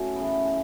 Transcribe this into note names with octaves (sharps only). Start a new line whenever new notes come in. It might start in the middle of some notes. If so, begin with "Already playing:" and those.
Already playing: A3 C#4 E4 F#4
C#3 E3 B3